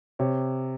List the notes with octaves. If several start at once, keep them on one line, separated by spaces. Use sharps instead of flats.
C3 C#5